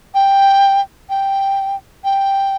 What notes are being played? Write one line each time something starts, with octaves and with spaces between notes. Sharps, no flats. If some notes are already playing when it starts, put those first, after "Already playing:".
G5
G5
G5